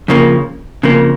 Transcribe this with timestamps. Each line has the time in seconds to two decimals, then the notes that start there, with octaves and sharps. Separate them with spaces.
0.08 F2 C#3 F3 A#3
0.83 F2 C#3 F3 A#3